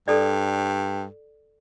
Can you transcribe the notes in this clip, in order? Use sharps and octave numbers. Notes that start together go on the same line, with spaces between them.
G2 A4 D5